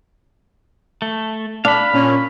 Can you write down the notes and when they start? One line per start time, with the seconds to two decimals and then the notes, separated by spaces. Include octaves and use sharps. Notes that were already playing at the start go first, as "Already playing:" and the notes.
1.02 A3
1.65 D4 F5 B5
1.93 A#2 C#4